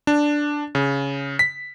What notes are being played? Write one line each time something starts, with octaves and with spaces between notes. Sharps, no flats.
D4
C#3
B6